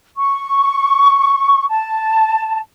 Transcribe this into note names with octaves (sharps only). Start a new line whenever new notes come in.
C#6
A5